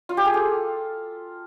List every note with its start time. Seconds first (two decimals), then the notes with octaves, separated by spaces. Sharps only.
0.09 F4
0.17 G4
0.26 G#4
0.34 A4